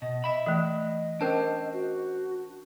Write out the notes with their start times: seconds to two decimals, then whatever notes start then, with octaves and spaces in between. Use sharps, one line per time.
0.02 B2 D#5
0.24 E5 B5
0.46 E3 A3 D#5
1.21 C#4 D4 A#4 C5 A5
1.73 F#4